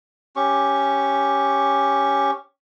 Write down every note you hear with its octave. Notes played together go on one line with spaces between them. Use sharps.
C#4 G4 C#6